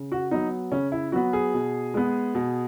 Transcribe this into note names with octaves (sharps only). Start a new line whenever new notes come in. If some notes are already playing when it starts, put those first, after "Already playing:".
Already playing: C#3
F#4
F#3 B3 D#4
C#3 C#4
E4
F#3 B3 F#4
G#4
B2
G#3 B3
B2